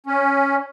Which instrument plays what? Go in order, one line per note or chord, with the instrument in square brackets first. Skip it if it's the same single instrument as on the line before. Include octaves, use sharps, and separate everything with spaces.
[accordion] C#4